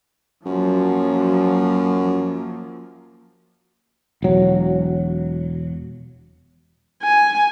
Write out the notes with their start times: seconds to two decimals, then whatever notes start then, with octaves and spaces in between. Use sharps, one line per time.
0.46 F#2 F3 F#3 A#3
4.22 E1 F#3
7.03 G#5